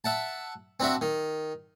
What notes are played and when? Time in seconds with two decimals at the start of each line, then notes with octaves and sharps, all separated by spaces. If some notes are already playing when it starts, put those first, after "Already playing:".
0.04 E5 F#5 A5
0.80 C4 D4 F#4 E5
1.01 D#3